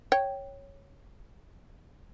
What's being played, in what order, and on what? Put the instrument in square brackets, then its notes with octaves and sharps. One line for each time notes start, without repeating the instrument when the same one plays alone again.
[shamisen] C#5 G5